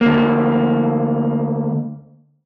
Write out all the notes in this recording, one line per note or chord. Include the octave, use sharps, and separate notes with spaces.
D2 A#3